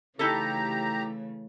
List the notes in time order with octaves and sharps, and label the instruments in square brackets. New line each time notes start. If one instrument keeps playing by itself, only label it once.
[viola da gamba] C#3 E3 A3 [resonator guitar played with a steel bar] D#4 E4 A4 [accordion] G4 A#5